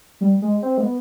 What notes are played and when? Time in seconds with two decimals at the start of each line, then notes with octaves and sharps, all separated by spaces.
0.21 G3
0.42 G#3
0.62 C4
0.78 G#3
0.83 B3